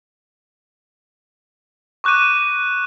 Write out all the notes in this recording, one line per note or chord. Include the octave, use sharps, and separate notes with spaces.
C#6 D6 F#6 G6 D#7